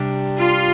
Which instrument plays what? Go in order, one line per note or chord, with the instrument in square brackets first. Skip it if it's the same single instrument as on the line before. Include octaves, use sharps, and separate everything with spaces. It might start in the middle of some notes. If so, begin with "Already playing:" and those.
Already playing: [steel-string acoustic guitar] C3 G3 D4 G4
[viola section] F4